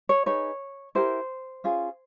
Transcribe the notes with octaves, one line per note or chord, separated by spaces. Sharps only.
C#5
D#4 G#4 B4 C#5
E4 G4 A#4 C5
C#4 F4 G#4